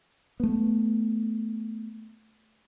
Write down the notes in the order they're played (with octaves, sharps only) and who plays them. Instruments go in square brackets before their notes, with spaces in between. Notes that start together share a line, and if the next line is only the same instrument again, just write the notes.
[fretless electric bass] A3 B3